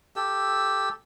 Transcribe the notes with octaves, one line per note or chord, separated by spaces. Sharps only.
G4 A4 E6